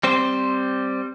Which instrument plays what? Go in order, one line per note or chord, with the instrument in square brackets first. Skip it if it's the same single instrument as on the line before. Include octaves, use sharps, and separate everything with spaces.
[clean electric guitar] G3 C4 C5